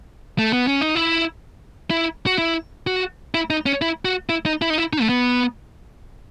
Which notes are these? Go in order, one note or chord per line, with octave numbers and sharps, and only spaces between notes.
A3
B3
C#4
D#4
E4
E4
F#4
E4
F#4
E4
D#4
C#4
E4
F#4
E4
D#4
E4
D#4
E4
D#4
A3
B3